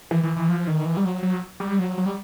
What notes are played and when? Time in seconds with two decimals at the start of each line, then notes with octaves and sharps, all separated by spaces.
0.11 E3
0.23 E3
0.36 E3
0.49 F3
0.67 D#3
0.85 E3
0.97 G3
1.05 F#3
1.23 F#3
1.60 G3
1.79 F#3
1.98 F#3
2.06 G3